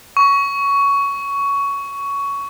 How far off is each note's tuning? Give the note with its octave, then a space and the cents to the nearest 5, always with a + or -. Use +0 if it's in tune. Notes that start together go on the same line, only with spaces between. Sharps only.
C#6 +15